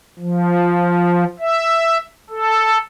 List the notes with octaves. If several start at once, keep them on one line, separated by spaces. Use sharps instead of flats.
F3
E5
A4